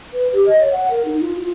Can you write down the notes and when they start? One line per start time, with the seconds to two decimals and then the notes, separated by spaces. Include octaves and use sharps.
0.13 B4
0.33 G4
0.46 D#5
0.60 C#5
0.72 F#5
0.91 A#4
1.05 D#4
1.21 F4
1.39 F4